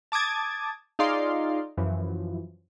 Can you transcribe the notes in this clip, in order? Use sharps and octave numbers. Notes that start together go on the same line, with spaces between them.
A5 D6 D#6 G#6 A6
D#4 F4 G#4 D5 F5 C6
F#2 E3 F3